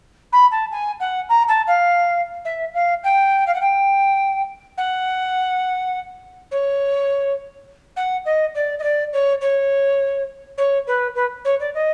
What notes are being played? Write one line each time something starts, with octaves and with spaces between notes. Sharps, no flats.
B5
A5
G#5
F#5
A#5
A5
F5
E5
F5
G5
F5
F#5
G5
F#5
C#5
F#5
D#5
D5
D#5
D5
C#5
C#5
C#5
B4
B4
C#5
D5
D#5